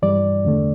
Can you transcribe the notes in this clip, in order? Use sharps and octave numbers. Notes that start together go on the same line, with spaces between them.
G2 E3 G3 D5
E2 D3 A3